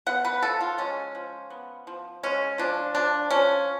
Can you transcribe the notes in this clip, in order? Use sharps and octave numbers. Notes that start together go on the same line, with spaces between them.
B3 F#5
B4
F3 A4
F4
G#3 C#4
F3
B3
F3
G#3 C#4
F3 D4
F3 D4
F3 C#4